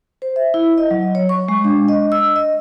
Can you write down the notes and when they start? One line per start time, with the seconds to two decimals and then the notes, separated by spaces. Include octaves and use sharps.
0.22 C5
0.36 E5
0.54 E4
0.78 D#5
0.91 F#3
1.15 C#5
1.29 C#6
1.48 G#3
1.64 D4
1.88 D#5
2.12 E6
2.36 D#5